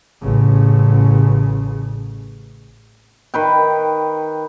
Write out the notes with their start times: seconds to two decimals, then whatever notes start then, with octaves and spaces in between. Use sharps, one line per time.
0.22 A1 C#3
3.34 D#3 B4 G5